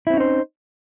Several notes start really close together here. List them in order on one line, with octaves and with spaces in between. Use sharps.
E4 C4 C#4 D#4 C5